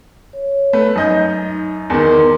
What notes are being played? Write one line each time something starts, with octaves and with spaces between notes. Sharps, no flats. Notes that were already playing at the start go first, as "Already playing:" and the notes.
C#5
A3 B4
F#2 D#4 D#5 G6
E2 D#3 A#4 C6